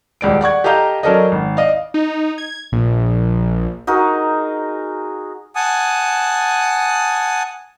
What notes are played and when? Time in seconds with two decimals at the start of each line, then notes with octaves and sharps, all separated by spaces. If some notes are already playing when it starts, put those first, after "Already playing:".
0.21 D#1 C#2 D5 D7
0.41 D5 F#5 C#6 G#6
0.64 G4 A4 D#5 F5 A#5 G6
1.03 F#3 C#4 A4 A#4 D5 D#5
1.32 G#1
1.57 D5 D#5 F5
1.94 D#4
2.38 G#6
2.72 A#1
3.87 D#4 F#4 G#4 A#4
5.56 F#5 G#5 A5 D#6